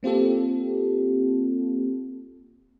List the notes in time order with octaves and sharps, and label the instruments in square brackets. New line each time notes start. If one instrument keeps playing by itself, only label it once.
[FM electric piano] A#3 C4 F4 G4 A4